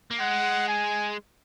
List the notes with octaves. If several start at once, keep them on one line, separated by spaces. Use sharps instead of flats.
A#3
G#3 F#5
G#5